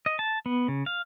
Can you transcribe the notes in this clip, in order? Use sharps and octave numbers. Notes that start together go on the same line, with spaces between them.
D#5
A5
B3
C#3
F5